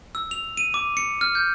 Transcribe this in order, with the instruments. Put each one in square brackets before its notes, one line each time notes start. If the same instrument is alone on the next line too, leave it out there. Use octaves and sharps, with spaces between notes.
[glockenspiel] E6
F7
D#7
D6
C#7
F6
G6